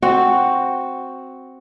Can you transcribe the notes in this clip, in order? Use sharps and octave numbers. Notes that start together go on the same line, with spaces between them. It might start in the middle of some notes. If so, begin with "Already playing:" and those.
C4 F#4